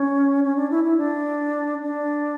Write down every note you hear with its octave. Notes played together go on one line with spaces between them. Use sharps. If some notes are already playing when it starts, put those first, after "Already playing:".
Already playing: C#4
C#4
D4
E4
E4
D4
D4